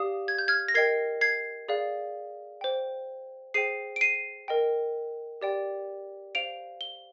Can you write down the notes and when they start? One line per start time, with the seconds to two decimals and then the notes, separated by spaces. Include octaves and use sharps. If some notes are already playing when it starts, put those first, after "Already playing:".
Already playing: G4 D5 F5 D#6
0.28 G#6
0.38 G6
0.48 F6 G#6
0.68 A#6
0.74 A#4 D#5 G5 G#6 C7
1.21 G#6 C7
1.69 G#4 D5 F5
2.61 C5 G5
3.54 G#4 C5 G5 C7 D#7
3.96 D7
4.01 C7 D#7
4.48 A#4 D#5 G5
5.41 G4 D5 G5
6.35 C5 F5 D7 F7
6.81 G7